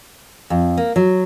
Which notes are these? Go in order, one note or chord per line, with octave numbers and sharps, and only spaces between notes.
F2
A#3
F#3